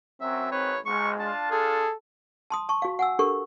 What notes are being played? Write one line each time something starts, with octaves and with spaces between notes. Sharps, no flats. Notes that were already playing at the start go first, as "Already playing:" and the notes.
F#2 F#3 C4 E5
G#1 D#3 B4 C#5
B1 G#2 G#3 C#6
D4 F4 A5
G#4 A4
A5 C6 D#6
A5 C#6
F#4 F5
F#5 G#5 E6
D4 G4 A4 A#4 C#6